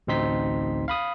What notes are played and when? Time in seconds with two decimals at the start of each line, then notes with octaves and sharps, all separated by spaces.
0.07 A1 D2 C4 D#4 C6 B6
0.88 F5 B5 D#6